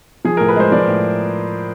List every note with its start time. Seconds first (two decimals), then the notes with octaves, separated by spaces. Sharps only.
0.25 F3 G#4
0.37 A2 A#4
0.48 B4
0.56 G#3 C5
0.72 F3 D5
0.88 A2